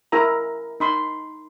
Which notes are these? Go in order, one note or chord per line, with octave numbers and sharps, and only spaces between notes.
E4 G#4 A#4 A#5
D#4 B5 C6